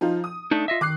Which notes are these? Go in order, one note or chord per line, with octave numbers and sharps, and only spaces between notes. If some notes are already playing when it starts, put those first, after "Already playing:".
F3 D#4 F4
D#6
A3 D4 D#4
F4 D#5 E5
D#3 D6 F#6 C7